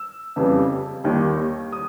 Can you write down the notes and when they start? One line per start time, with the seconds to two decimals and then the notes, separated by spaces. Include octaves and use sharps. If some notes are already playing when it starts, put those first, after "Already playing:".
Already playing: E6
0.36 F2 C#3 E3 G3
1.04 D#2 D#3 G3
1.72 D#6